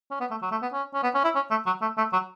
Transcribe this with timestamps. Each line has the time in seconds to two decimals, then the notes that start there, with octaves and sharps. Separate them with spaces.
0.11 C#4
0.20 B3
0.31 A3
0.42 F#3
0.51 A3
0.62 B3
0.73 C#4
0.94 C#4
1.03 B3
1.15 C#4
1.24 E4
1.35 C#4
1.51 A3
1.66 F#3
1.82 A3
1.98 A3
2.13 F#3